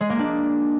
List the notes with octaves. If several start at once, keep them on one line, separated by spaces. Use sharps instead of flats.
G#3
A#3
D4